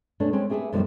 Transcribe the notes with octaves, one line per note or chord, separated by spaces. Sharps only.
B2 A3 C#4 D4
G#3 C4 C#4
A3 G4 G#4 A#4 B4 E5
F#2 B2 D#3 F3 G3 A3